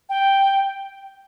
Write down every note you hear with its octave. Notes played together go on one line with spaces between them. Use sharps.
G5